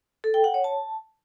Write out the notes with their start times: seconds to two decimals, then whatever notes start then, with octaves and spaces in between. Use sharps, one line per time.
0.24 A4
0.34 G5
0.44 F#5
0.54 C#5
0.64 A5